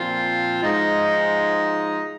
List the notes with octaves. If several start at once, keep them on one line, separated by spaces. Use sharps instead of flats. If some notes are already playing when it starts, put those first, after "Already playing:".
Already playing: A#2 F3 C4 F4
G#2 F3 G#3 D#4